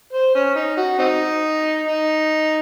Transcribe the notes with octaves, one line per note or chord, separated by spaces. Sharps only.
C5
C#4
D#4
F#4
C4 D#4
D#4